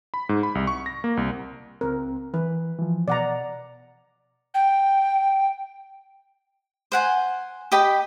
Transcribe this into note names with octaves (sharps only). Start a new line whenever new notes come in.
B5
G#2
B5
C2
C#6
A#6
A#3
C2
C#2 C4 A#4
E3 B4
E3 F3
B2 D5 F#5 A#5
G5
C5 F#5 G#5
G4 D#5 G5 B5